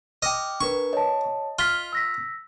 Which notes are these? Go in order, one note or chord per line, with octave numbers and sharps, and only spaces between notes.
D#5 G5 D6 F6
D4 A#4 B4 C#6
C#5 D#5 A5
F4 F6 B6 G7
E6 A#6 B6